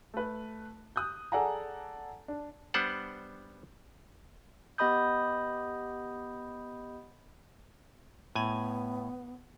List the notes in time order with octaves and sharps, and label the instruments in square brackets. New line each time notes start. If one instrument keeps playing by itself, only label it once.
[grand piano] A3 B4
D#6 F#6 G6
G#4 A4 D5 F#5 G#5 A#5
D4
[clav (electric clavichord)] G3 B3 D4 C5 F#5
[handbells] B3 G4 D#5 B5 D#6 G6
[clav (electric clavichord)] A2 G#5 [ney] B3